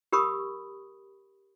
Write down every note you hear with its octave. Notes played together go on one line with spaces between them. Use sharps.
G4 A#4 B5 C#6 D#6